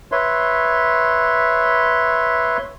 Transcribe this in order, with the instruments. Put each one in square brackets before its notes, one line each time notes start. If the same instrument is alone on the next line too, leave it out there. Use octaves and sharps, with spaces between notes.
[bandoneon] B4 C#5 E5 C6